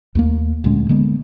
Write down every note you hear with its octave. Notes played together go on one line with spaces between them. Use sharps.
D#2 A3 A#3
D2 A#2 G#3 C#4
D3 G#3 A#3 B3